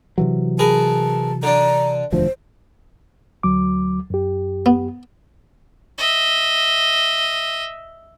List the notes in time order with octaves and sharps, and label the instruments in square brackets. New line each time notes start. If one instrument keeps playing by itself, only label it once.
[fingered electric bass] C3 E3 F#3
[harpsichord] G#4 A#4 B4 [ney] A5
[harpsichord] D3 D4 [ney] A#5
[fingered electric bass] E1 D2 F3 [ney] C5
[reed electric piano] D2 F#3 D6
F#2 G4
[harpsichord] B3
[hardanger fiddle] D#5 E5